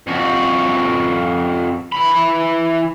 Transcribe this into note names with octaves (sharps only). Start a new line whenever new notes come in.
F2 F#4
E3 B5